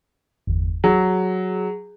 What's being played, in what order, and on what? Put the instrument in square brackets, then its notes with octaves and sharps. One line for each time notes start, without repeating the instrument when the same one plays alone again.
[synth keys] G1 E2
[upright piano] F#3 [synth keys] G#4